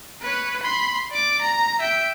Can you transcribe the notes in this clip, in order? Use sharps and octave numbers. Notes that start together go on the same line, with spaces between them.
B4 C#5
B5 C6
D5 D6
A#5
E5 G5